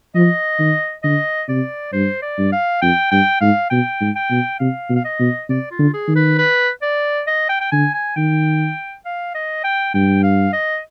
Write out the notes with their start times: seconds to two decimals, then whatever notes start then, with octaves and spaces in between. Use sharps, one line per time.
0.15 F3 D#5
0.59 D#3
1.03 D3 D#5
1.49 C3 D5
1.93 G2 C5
2.22 D5
2.38 G2
2.52 F5
2.82 F2 G5
3.11 G2 G5
3.41 G#2 F5
3.70 B2 G5
4.00 G#2
4.16 G5
4.30 B2
4.59 C3 F5
4.90 B2
4.96 F5
5.05 D#5
5.19 B2
5.49 C3 D5
5.71 F4
5.79 D3
5.94 G#4
6.08 D#3
6.16 B4
6.38 B4
6.82 D5
7.27 D#5
7.50 G5
7.61 G5
7.72 D3 G#5
7.94 G#5
8.16 D#3 G5
9.05 F5
9.35 D#5
9.64 G5
9.94 G2 G5
10.23 F5
10.53 D#5